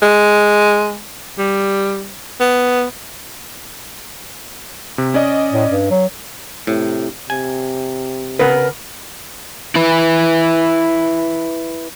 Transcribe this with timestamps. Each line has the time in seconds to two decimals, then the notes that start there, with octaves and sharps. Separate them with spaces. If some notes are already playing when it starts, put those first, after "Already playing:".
0.02 G#3
1.38 G3
2.40 B3
4.98 C3
5.14 C#4 D5 D#5
5.53 A2
5.70 G2
5.91 F#3
6.67 A2 C3
7.30 C3 G#5
8.39 C#3 A#4 B4 F#5
9.75 E4 B4